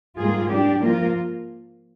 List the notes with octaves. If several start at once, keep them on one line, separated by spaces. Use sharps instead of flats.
G#2 G3 A#3 F4 G#4
G3 D4 G4
F3 A#3 F4 A#4